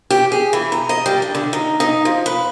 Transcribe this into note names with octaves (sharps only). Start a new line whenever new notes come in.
G4
G#4
E3
A#5
D#5
G3
D4
D3
D#4
D#4
F3
B4